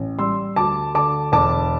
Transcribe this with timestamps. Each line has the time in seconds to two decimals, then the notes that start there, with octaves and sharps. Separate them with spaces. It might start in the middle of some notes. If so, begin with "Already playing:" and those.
Already playing: A1
0.19 G3 C6 E6
0.56 D2 A5 D6
0.94 D3 A5 D6
1.32 E1 A5 D6